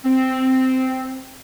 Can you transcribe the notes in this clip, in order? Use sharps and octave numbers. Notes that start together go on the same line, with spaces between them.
C4